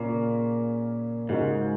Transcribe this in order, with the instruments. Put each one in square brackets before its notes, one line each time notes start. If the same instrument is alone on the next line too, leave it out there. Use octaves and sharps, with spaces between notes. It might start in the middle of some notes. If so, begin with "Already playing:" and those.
Already playing: [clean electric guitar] A#2 [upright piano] C#3 C#4 A#4
[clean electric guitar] G#2 [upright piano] C#3 G#3 D#4 F#4 A#4